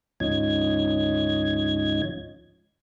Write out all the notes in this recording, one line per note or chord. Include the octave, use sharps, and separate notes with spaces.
D2 G#2 F3 C#4 D#4 G#6